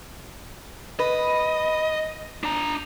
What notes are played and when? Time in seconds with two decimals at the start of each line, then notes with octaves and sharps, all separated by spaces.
0.99 B4 D#5
2.44 D4 A#5